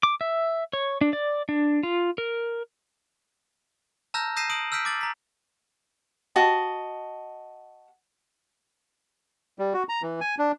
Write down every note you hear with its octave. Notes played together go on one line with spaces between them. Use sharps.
D6
E5
C#5
D4
D5
D4
F4
A#4
A5 A#5 E6 F6 G6 A#6
D#6 G6 A#6 C7 D#7 E7
D#6 D7 F#7
E6 F6 G6 B6 D7
D6 A6 F#7
A#5 B6
F#4 D#5 A5
G3
F#4
A#5
E3
G#5
D4